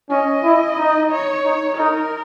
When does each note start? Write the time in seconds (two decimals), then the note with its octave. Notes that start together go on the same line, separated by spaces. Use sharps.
0.10 C#4 D#5
0.44 E4
0.77 D#4
1.11 C#5
1.45 D#4
1.78 D#4 A#4